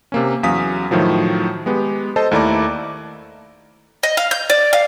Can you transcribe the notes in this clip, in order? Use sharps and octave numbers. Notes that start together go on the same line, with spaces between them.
C3 A#3 C#4
E2 F#3 C#4 F5 D#6 B6
A2 D#3 F3 F#3
G#3 B3 G4
A4 C5 D#5 A5
D#2 A3 E4 D5 A#5 D6
D#5
F5
G6
D5
F5